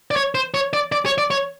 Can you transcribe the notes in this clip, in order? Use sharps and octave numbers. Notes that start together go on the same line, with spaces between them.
D5
C#5
C5
C#5
D5
D5
C#5
D5
C#5